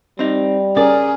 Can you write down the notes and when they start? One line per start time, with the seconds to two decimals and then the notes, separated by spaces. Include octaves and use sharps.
0.19 G3 C4 D#4
0.77 C#4 G#4 A#4 D5